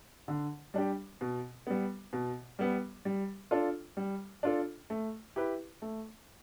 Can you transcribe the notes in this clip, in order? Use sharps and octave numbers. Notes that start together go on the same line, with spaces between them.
D3
G3 D4 G4
B2
G3 B3
B2
G3 B3
G3
D4 F4 A4
G3
D4 F4 A4
A3
E4 G4 B4
A3